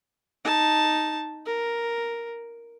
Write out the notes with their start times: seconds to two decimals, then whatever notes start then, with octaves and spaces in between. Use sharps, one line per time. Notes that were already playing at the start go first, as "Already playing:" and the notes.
0.45 D#4 A5
1.46 A#4